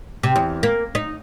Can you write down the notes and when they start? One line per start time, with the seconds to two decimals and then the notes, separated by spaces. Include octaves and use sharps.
0.23 C3
0.36 E2
0.63 A#3
0.95 D#4